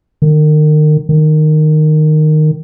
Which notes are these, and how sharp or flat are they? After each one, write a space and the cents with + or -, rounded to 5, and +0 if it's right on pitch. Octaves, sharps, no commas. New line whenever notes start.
D#3 -35
D#3 -15